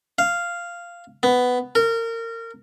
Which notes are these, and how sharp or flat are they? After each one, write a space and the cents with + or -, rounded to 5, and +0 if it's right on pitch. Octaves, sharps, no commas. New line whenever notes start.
F5 -5
B3 +10
A#4 -25